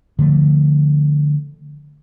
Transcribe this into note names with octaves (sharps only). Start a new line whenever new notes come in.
D3 F3 A3